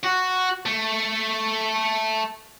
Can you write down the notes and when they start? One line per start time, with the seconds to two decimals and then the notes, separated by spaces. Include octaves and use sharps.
0.04 F#4
0.66 A3